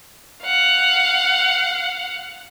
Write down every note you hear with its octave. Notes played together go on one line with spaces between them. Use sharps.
F5 F#5